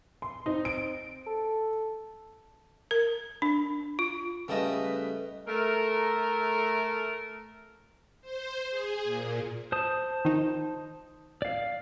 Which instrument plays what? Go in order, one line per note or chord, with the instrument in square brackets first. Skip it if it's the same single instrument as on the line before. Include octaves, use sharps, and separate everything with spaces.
[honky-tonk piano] C6
[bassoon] C4 [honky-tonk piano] D#4
[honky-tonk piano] D7
[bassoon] A4
[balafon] A#4
D4
F4
[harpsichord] C#3 G3 A3 [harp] A4 D#5 [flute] B4
[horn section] A3 A#4
[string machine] C5
G#4
A#2
[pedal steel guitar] C5 A5 D#6
[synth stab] D#3 F3 D#4
[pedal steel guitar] D5 F5